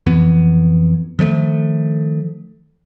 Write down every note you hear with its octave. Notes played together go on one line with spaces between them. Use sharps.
F2 E3 B3
D#3 F3 G#3 A3